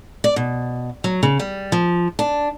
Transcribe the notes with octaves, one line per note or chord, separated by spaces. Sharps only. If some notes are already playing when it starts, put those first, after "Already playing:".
D5
B2
F#3
C#3
G3
F3
D4